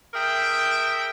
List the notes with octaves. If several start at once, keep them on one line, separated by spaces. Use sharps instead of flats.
G#4 A#4 E5 G5